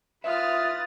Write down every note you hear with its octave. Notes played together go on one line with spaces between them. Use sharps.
F4 B4 E5 D#6 F6 A6